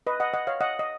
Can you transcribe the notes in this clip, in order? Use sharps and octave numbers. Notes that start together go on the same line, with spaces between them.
B4 D#5
D#5 F#5
D#5 F#5
C#5 F5
D#5 F#5
D#5